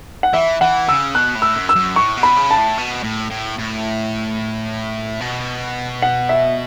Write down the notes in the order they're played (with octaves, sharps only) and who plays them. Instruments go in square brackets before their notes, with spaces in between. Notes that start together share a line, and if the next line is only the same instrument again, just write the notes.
[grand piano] F#5
[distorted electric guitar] E3 [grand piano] E5
[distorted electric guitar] E3 [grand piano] F#5
[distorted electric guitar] C#3 [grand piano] E6
[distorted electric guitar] B2 [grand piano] F#6
[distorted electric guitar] A2
[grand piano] E6
[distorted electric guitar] F#2
[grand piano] E6
[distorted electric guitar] F#2
[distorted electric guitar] A2 [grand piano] C#6
[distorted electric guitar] B2
[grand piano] B5
[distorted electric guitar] C#3
[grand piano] A5
[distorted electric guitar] A2
B2
A2
A2
A2
B2
[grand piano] F#5
E5